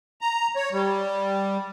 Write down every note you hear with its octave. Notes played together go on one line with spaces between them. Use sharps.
A#5
C#5
G3